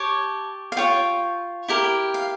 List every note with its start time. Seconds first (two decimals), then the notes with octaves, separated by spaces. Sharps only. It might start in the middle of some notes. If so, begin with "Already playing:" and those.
Already playing: G4 C#5 A5
0.72 F5
0.77 F4 C#5 G5
1.68 E4 G4 A#4
2.14 F5